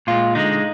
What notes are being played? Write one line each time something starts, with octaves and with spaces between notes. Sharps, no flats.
A#2 G#3 F4
D3 G#3 D#4